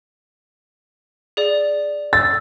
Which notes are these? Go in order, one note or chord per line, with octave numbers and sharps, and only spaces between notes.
G#4 D5
E6 A6